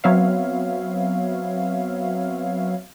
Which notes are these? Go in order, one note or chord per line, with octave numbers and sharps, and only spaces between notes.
F#3 B3 C4 C#5 E5 F5